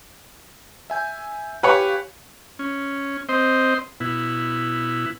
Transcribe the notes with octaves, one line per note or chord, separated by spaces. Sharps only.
E5 G#5 G6
G4 B4 C#5 F5 G#5
C#4
C4 C5 D#5
B2 E4